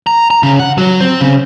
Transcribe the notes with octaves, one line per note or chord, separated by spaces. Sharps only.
A#5
A#5
C#3
F#5
F#3
C4
C#3